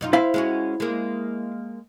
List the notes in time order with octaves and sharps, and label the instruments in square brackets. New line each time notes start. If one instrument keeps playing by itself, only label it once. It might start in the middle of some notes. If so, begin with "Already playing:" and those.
[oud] F#2 D#4 F4
[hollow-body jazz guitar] E4 F5 [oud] C5
[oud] G#3 C#4 F#4
G#3 A#3